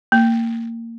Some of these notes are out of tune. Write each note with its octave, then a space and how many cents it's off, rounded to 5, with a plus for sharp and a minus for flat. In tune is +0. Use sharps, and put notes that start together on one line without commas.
A#3 -25